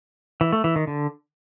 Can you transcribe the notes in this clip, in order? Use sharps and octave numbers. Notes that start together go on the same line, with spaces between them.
E3
A3
E3
D#3
D3